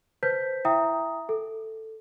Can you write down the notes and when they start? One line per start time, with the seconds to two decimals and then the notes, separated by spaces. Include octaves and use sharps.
0.23 B4 C5 A5 G6 B6
0.65 E4 E5 G5 A#5 D#6
1.29 A4